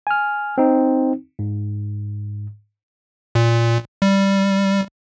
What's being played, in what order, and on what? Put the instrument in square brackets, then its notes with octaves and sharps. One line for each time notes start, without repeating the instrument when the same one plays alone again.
[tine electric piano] G#5 F6
C4 D#4
G#2
[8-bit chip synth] A#2
G3